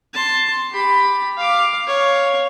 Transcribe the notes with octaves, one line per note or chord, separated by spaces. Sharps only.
A5 C6
G4 B5
F5 D6
C#5 F5